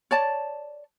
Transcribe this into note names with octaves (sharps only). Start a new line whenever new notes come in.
C#5 D5 A5